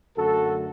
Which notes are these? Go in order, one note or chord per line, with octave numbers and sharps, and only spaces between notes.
F#2 D3 A3 F#4 A4